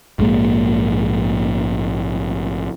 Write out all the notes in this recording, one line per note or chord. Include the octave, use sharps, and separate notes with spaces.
A#1 G#2 G#3 A#3